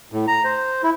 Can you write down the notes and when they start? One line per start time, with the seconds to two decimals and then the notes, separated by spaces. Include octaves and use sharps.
0.12 A2
0.27 A#5
0.44 C5
0.83 E4